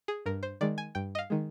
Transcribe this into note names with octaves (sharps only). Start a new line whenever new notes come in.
G#4
G2 A#4
C5
D#3 G#3 D5
G#5
G2 G5
D#5
F5
D#3 G#3